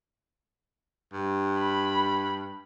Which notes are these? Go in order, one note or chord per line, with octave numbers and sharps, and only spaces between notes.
G2
B5